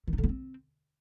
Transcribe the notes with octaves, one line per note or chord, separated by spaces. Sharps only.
D#3
D#4
D3
B3
C4